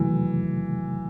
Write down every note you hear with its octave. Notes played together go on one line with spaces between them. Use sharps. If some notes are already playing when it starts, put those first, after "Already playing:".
Already playing: E2 C3 D#3 E3 F#3 A3